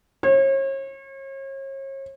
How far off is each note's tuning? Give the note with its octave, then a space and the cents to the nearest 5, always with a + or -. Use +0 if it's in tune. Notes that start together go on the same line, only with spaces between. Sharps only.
C#5 -40